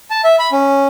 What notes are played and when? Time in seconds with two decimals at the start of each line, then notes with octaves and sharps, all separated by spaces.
0.11 A5
0.24 E5
0.39 B5
0.52 C#4